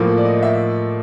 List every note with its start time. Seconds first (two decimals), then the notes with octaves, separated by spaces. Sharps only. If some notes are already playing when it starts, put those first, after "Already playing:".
Already playing: A2 F3 A#3
0.18 D5
0.25 D#5
0.43 E5